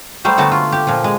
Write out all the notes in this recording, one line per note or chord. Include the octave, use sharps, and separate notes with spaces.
F#3 G3 A3 C5
D3 F#3 A3 B3 F#4 A5
F4
G4
A#2 F3
G#3